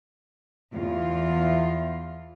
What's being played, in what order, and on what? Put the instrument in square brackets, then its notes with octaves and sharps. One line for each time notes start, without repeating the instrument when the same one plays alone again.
[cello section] E2 F4